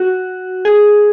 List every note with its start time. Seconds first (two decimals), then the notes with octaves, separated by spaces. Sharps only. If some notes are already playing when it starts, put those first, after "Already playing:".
Already playing: F#4
0.65 G#4